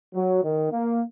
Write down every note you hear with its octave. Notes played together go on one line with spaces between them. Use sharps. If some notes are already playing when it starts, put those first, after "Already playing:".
F#3
D#3
A#3